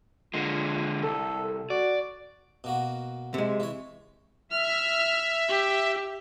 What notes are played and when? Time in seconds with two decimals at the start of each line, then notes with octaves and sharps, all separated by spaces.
0.34 D3 G#3 F4
1.03 C2 A4
1.70 F#4 D5
2.64 B2 A#3 F#4
3.34 C3 G#3
3.60 E3 C#5
4.51 E5 F6
5.49 G4